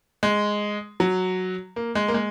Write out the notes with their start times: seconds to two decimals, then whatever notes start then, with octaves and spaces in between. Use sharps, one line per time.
0.23 G#3
1.00 F#3
1.76 A#3
1.95 G#3
2.08 A#3
2.14 G#3